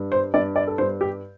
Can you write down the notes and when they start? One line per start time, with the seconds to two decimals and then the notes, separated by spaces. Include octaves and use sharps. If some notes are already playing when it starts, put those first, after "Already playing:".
Already playing: G2
0.12 C5
0.34 G2 D5
0.56 D5
0.67 A4
0.78 G2 C5
1.01 G4